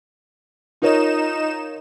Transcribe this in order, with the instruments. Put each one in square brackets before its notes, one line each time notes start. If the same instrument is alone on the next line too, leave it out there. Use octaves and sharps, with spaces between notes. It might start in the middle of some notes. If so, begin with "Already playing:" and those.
[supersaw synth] D#4 E7 [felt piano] F4 A#4 C#5